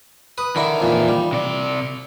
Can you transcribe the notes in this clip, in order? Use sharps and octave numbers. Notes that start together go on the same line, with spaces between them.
B4 D#6
D3 D#3 E4 A#4
F2 A#2 E3
G3
C3 D5